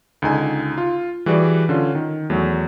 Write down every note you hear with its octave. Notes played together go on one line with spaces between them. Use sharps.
C#2 D3 D#4 G#5
F4
E3 G3 F#4 G#4 B4 D5
D3 C#4 F4
D#3
E2 F#3 A3